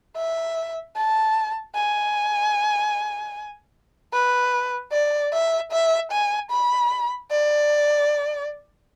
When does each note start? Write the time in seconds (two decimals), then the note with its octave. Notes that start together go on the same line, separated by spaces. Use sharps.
0.16 E5
0.96 A5
1.75 G#5
4.13 B4
4.92 D5
5.32 E5
5.72 E5
6.12 G#5
6.51 B5
7.31 D5